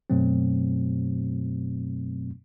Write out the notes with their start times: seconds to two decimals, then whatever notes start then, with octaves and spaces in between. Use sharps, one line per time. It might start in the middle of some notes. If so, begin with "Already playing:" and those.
0.10 F#2 B2 F#3 A3 C4